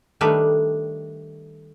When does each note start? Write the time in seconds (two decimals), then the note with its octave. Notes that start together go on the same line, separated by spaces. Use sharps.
0.21 D#3 G3 A3 D4 B4